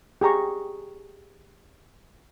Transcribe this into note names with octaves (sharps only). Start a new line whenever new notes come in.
G4 G#4 A#5 C#6